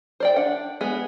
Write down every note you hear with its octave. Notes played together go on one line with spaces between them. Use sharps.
C5 D5 G5
D4 F#5
G#3 B3 G#4